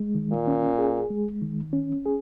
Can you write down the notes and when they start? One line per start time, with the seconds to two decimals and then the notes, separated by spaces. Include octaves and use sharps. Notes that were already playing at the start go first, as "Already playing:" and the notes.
Already playing: G#3
0.15 D#3
0.32 A#2
0.47 C#4
0.78 G#4
1.10 G#3
1.42 D#3
1.73 C#4
2.06 G#4